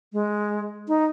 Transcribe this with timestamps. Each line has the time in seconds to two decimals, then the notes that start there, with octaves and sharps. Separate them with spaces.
0.13 G#3
0.88 D#4